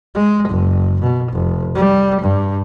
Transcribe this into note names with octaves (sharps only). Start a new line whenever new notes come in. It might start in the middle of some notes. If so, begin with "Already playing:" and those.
G#3
F#1
B2
F1
G3
G2